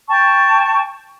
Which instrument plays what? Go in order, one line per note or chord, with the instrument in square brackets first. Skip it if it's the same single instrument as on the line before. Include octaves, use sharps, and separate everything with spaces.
[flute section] G5 A5 C#6